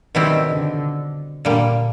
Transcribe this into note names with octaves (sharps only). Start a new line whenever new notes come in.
B2 D#3 G3 C4 E4
D3
A#2 D3 G3 A#3